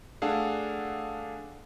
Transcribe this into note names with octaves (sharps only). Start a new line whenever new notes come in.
A3 D4 G#4 A4 F5 F#5